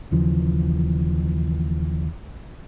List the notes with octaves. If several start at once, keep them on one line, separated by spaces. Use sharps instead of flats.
D#2 C#3 E3 F3